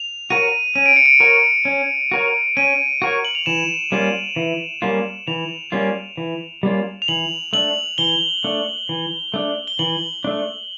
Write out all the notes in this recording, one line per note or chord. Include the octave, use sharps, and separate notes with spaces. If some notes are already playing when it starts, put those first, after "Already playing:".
Already playing: F7
F#4 A#4 C#5 D#7
C#4 D#7
D7
C#7
D7
F#4 A#4 C#5
C#4
F#4 A#4 C#5
C#4 D#7
F#4 A#4 C#5
F#7
F7
E3 E7
G3 A#3 C#4 F4
E3
G3 A#3 C#4 F4
E3 F7
G3 A#3 C#4 F4
E3
G3 A#3 C#4 F4
F7
E3 F#7
A3 D4 F#7
E3 G7
A3 D4
E3
A3 D4
G7
E3 F#7
A3 D4